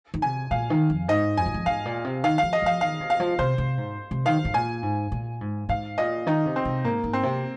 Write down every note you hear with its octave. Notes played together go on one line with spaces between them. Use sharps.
D#3
C3 G#5
A#2 F5
D#3
F2
G#2 D#5
F2 G#5
G#2
F2
G#2 F5
A#2
C3
D#3 F5
F3 F5
D#5
F3 F5
D#3 F5
C3
F5
F3
C3 C5
C3
G#2
C3
D#3 F5
G#2
A#2 G#5
G#2
A#2
G#2
G#2 F5
A#2 D#5
D#3 D#4
C3
C4
C3
G#2 A#3
G#2
C4
C3